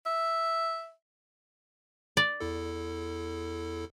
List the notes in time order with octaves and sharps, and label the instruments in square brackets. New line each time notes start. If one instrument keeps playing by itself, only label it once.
[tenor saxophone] E5
[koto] D5
[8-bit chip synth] E2 E4 A4